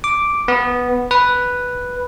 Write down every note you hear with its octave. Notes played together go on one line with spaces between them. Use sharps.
D6
B3
B4